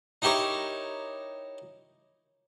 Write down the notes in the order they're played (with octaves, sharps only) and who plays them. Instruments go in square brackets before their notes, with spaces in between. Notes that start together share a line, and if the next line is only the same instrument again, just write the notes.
[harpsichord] D#4 E4 G4 A#4 C#5